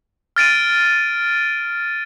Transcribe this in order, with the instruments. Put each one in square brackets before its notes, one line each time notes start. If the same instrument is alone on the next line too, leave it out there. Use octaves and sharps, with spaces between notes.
[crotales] F6 A6 D7 D#7